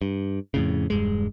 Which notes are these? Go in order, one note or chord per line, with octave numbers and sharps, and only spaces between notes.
G2
F2 A2 C#3
E1 G2 G#3